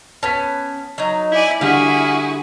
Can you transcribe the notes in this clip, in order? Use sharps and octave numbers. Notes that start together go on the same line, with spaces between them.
B3 C#4 A5 B6
F#3 D#4
E4 D5 G#5
D3 G3 E4 F#4 G#4 F5 B6